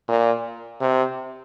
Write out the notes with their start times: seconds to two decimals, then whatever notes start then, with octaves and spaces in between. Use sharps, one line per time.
0.09 A#2
0.81 C3